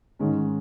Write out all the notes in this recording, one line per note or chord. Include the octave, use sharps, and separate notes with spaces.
G#2 D#3 G#3 C#4